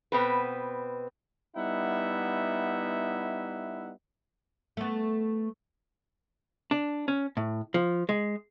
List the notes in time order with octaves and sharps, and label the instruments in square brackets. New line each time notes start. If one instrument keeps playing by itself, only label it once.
[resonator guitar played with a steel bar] B2 B3 C4 B4
[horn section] G3 B3 D#4 E4 E5 F#5
[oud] A3 B3
[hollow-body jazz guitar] D4
C#4
A2
F3
G#3